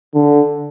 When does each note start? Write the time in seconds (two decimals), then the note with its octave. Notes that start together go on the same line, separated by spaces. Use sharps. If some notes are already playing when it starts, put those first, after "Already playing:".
0.14 D3